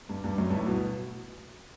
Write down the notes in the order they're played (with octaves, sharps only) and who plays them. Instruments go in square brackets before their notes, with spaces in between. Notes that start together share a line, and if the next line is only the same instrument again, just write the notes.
[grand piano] G2
G2
F#2
G2
A2
B2